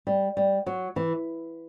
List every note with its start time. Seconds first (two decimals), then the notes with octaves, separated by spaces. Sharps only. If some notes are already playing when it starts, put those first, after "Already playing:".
0.07 G3
0.37 G3
0.66 F#3
0.96 E3